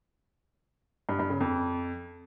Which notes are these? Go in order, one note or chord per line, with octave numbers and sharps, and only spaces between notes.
G2
G2
C#3
F2